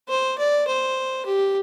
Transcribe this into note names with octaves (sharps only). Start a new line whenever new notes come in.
C5
D5
C5
G4